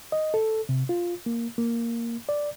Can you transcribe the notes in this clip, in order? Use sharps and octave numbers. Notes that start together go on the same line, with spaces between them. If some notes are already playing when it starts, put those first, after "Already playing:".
D#5
A4
C3
F4
A#3
A#3
D5